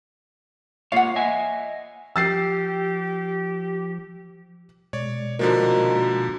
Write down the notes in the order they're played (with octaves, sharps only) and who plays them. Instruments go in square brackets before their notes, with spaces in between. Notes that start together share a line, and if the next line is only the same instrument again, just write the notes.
[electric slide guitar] A#3 F4 C#5 [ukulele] F5 F#5
[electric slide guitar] D#5 E5 G#5
[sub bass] F3 [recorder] G4 [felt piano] E6 A6 C7
[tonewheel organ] B2 G#3 [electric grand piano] C#5 D5
[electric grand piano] D3 F3 A#3 [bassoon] D#3 [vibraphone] F#4 A#5